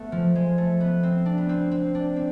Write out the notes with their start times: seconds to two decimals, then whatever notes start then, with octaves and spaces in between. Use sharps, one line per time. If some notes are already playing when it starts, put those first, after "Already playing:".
Already playing: A3 B3
0.12 F3
0.35 G#3
0.58 A3
0.80 B3
1.03 C4
1.26 D4
1.38 B3
1.49 C4
1.71 C4
1.95 D4
2.16 C4